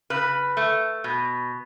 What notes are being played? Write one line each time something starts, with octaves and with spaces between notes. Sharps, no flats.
C#3 B4
A3
B2